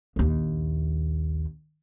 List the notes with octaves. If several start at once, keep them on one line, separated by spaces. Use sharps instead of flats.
A#1 D#2